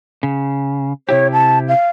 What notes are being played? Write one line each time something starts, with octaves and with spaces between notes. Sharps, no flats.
C#3
C3 E4 G4 C#5
A5
F5